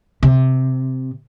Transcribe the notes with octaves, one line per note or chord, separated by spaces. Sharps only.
C3